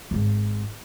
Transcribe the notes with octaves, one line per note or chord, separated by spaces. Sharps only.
G#1 G#2